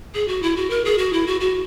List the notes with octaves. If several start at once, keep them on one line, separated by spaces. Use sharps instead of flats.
G#4
F#4
E4
F#4
A#4
G#4
F#4
E4
F#4
F#4